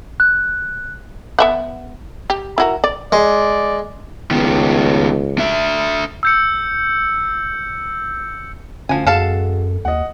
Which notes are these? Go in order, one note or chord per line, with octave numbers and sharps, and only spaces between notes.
F#6
B3 E5 F#5
G4
E4 F#4 A#4
D5
G#3 D5
C#2 D#3 B3
D4 E5
E6 G6 C#7
D2 F3 C#4 G#5
F#2 G#3 F#4 A4 F5 A5
D#2 D#5 F#5